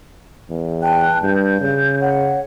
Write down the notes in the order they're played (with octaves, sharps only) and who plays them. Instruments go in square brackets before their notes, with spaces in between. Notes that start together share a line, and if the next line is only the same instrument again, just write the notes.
[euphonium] E2
[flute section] G5 A5 F#6
[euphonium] G2 [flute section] G6
[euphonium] C#3
[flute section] C#5 F#5